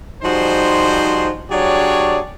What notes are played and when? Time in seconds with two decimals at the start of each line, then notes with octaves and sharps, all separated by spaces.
0.23 F3 G3 D#4 F#4 G#4 C5
1.50 F#3 D4 G4 G#4 C#5 D5